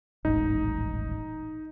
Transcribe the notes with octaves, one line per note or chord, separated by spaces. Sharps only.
D#1 A1 G#2 D#4